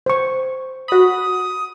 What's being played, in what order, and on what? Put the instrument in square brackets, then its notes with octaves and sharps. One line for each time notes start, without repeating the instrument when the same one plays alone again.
[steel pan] C5 C#6
[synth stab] F#4 B5 [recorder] D#6